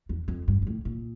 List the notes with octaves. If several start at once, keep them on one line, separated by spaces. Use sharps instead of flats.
E2
F2
G2
G2
A2
A#2